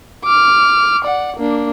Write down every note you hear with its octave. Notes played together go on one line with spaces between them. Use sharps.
D6 F6
D5 F#5
A#3 D4